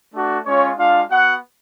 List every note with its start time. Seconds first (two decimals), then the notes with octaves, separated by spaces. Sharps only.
0.12 A3 D4 F#4
0.45 G#3 C#4 F4 C#5
0.77 G#3 D4 F4 F5
1.10 B3 F#4 F#5